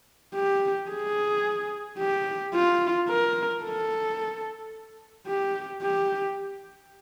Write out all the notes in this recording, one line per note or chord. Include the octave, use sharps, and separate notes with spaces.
G4
G#4
G4
F4
A#4
A4
G4
G4